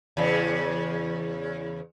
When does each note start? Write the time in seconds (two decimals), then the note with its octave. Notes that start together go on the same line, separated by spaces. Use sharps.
0.17 E2 C#3